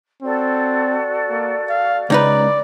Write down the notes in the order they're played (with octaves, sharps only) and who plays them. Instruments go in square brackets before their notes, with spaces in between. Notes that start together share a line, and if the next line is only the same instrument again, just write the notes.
[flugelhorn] C4 [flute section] F#4 A4 D5
[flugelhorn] A#3
F5
[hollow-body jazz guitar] C#2 D#4 B4 [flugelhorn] D5 [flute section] A#5